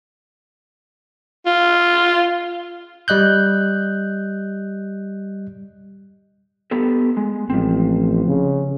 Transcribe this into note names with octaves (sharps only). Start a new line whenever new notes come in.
F4
G3 D#5 F#6 G6
B3 G4 A4
G#3
A1 F3 C4
C#3